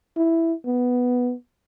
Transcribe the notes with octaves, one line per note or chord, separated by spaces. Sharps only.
E4
B3